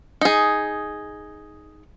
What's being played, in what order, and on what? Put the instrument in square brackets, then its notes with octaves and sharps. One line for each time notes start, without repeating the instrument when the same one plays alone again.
[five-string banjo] D#4 G#4